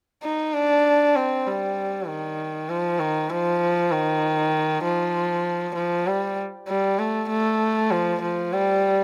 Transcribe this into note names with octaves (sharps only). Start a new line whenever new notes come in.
D#4
D4
C4
G3
D#3
F3
D#3
F3
D#3
F3
F3
G3
G3
A3
A3
F3
F3
G3